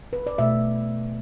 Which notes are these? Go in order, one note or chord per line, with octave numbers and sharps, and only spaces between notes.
B4
D5
B2 A3 E5